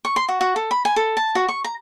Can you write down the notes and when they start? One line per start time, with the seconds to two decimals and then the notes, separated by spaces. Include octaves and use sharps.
0.05 C#6
0.16 C6
0.29 F#4
0.41 F#4
0.56 A4
0.71 B5
0.85 G#5
0.96 A4
1.17 A5
1.35 F#4
1.49 C#6
1.64 A#5